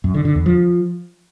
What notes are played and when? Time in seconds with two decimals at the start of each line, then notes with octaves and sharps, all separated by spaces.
0.04 F#2
0.14 D3
0.25 D3
0.35 E2
0.46 F3